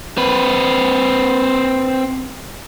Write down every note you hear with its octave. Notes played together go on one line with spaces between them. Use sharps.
C4 B4